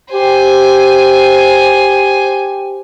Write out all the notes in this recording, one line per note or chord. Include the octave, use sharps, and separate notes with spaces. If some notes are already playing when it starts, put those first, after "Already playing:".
G4 C5 G#5